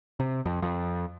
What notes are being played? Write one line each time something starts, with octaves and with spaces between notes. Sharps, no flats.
C3
F2
F2